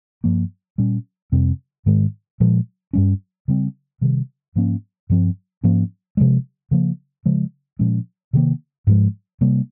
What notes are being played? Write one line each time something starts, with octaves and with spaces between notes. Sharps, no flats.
G2 F3 A#3
A#2 G3 C#4
F2 C3 G3 C4
G#2 D#3 G#3
A#2 F3 G#3
G2 G3 C#4
C#3 G3 C4
C3 D#3 G3
G#2 F3 A#3 C#4
G2 F3 C4
G#2 F3 A#3 C#4
C3 F3 G#3
C#3 F3 A#3
C#3 F3 G#3
A#2 F3 G#3 C#4
C3 D#3 A#3
G#2 F3 G#3
C3 G3 A#3